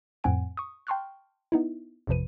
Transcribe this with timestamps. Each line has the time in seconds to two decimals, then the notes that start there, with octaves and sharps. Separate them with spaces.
0.24 F2 A2 C4 F#5 G#5 D7
0.57 C#6 D#6
0.87 G5 A5 C6 C#6 F6 F#6
1.52 B3 D#4 E4
2.07 A1 F2 C3 F3 B4 D#7